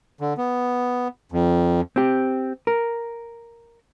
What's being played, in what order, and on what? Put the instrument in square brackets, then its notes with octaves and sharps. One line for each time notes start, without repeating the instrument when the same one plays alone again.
[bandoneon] D3
B3
F2
[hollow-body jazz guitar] C4 G4
A#4